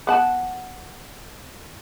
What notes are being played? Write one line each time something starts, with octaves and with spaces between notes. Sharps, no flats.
B3 F#5 A5